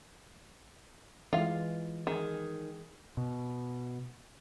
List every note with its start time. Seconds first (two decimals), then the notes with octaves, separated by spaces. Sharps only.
1.33 E3 G#3 F4 F5
2.07 D#3 G#4
3.17 B2